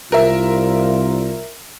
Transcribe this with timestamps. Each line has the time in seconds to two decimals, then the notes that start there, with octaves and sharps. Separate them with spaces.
0.12 C2 F4 A#4 E5